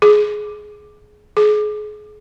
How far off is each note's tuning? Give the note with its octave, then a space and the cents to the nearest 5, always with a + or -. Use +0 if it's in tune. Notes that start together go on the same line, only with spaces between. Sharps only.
G#4 +15
G#4 +30